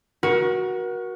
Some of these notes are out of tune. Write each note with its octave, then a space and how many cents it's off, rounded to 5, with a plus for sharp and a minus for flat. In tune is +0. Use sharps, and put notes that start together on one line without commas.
F#4 +0 A#4 +35